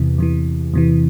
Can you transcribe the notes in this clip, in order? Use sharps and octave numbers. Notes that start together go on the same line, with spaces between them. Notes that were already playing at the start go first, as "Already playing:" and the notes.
Already playing: E2 C3 E3
E2 C3 E3
E2 C3 E3